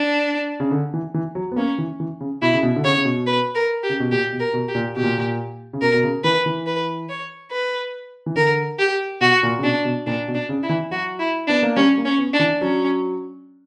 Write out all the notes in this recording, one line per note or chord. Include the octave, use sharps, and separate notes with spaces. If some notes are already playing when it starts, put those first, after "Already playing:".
Already playing: D4
C#3
D3
E3
E3
F#3
B3
A#3 C#4
E3
E3
C#3
B2 E4
C#3
B2
D3
C#3 C#5
C#3
B2
B4
A#4
G4
C#3
B2
A#2 G4
B2
A#4
B2
G4
A#2
B2 G4
A#2
A#2
C#3
B2 A#4
B2
C#3
E3 B4
E3
B4
C#5
B4
E3
D3 A#4
G4
B2 F#4
A#2
C#3
B2 D4
B2
A#2 D4
B2
D4
C#3
E4
E3
F#3 F#4
E4
B3 D4
A#3
G3 C#4
A#3
C#4
B3
D4
E3
F#3 C#4